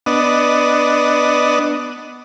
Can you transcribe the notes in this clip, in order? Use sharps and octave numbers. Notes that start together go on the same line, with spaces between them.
B3 D4 D#5